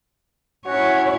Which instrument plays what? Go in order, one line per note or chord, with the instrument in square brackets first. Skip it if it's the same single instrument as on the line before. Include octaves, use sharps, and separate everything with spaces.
[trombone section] C#4 F#4 [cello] E4 C#5